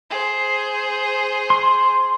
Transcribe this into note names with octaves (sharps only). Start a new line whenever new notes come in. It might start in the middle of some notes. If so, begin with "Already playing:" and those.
G#4 C5
C6